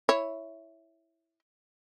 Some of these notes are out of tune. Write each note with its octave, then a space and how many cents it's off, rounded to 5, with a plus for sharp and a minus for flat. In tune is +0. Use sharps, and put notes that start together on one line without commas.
E4 +0 C#5 +0